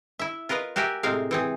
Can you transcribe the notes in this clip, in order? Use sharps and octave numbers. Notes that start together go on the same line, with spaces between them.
E4 E5
F4 A#4 B4 D#5 F5
F#4 G4 A#4 E5 G#5
A2 C3 G#3 C4 A#4 F5
E3 C4 G#4